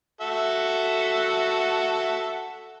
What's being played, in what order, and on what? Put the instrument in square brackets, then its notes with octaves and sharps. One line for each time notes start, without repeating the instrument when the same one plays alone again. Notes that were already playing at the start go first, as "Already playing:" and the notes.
[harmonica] F#4 A4 E5